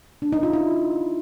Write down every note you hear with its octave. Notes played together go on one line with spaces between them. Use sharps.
D4
D#4
F4
E4